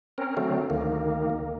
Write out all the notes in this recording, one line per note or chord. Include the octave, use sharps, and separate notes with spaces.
C4 C#4 A#4
D3 F#3 A3 C4
D2 D#3 A#3